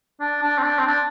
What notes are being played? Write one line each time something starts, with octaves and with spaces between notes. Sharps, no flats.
D4
D4
C4
D4
C4
D4